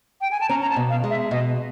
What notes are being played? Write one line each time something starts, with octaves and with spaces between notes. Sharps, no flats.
G5
G#5
A5
C#4 A#5
A#5
A5
B2
F5
G#3
E5
B2 D#5